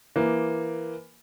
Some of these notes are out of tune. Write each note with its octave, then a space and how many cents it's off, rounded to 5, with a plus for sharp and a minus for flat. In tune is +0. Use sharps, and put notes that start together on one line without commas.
E3 +15 A#3 +10